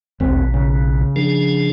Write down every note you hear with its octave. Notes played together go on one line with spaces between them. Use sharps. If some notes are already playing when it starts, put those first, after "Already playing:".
E1 A#1 D#2 B2 C4
C#3
F3 D4 G#4